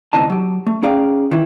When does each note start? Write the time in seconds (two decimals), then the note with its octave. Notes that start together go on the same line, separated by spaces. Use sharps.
0.13 D2 C3 E3 D#4 A5
0.30 F#3 G4
0.67 A3
0.82 C#4 D#4 G#4 D5 F5 G5
1.31 D#3 E3 E4